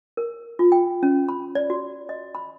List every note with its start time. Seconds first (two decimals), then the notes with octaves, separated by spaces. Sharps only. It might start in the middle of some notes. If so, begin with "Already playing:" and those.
0.17 A#4
0.59 F4
0.72 G5
1.03 C#4
1.29 B5
1.55 D5
1.70 F#4
2.09 D#5
2.35 B5